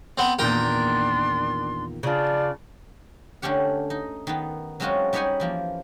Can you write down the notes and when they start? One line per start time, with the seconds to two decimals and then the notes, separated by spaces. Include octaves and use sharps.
0.18 B3 C4
0.39 E2 A#2 D#3 D4 A#4 G5 C6
2.03 C#3 D4 F4 D5
3.42 D3 A3 C#4 G4 F#5
3.90 D#4
4.27 D#3 B3
4.80 F#3 G#3 C4 C#4 F4 F#4
5.13 G3 D#4 G4 C#5 F#5 G#5
5.40 E3 F3 A#3